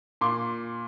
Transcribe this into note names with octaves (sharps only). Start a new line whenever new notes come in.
A#2 C6 D6